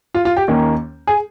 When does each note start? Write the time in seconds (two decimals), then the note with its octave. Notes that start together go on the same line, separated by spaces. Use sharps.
0.15 F4
0.25 F4
0.37 G4
0.48 D#2 D#3 A#3 C#4
1.07 G#4